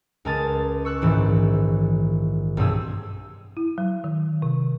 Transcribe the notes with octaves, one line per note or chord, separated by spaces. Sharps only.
C#2 G#3 A#4 A5 D#6 A6
C#6 E6 F#6
A#1 G#2 D#3 E3
B1 G2 C4 G#4 E6
E4
F#3
D#3
C3